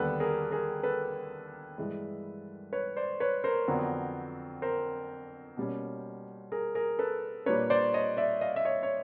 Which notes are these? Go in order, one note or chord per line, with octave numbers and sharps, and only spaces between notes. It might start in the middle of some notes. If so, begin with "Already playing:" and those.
Already playing: D#2 D3 G3 B3 A4 B4
G#4 A#4
G#4 A#4
A4 B4
G2 E3 G#3
B4 C#5
C5 D5
B4 C#5
A#4 C5
F2 D3 F#3 B3
A#4 C5
B2 G3 A#3 C#4
G#4 A#4
G#4 A#4
A4 B4
A#2 G3 A#3 D4 B4 C#5
C5 D5
C#5 D#5
D5 E5
D#5 F5
E5
C#5 D#5
C#5